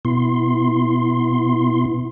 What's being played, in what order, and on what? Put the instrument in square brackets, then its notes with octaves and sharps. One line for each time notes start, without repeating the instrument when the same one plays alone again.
[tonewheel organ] B2 B3 E4 C6